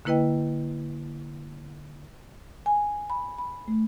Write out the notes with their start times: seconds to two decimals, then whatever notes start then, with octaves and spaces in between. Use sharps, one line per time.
0.05 D3 A#3 E4 B4 D#5 G5
2.66 G#5
3.10 B5
3.38 B5
3.68 A3